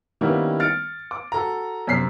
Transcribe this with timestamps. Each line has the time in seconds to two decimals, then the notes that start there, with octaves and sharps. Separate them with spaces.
0.21 D#3 G3 A#3 B3 C#4 E4
0.60 F6 A6 C#7 D7
1.11 D6
1.32 F#4 A4 A#5
1.87 F#2 C3 B6 C7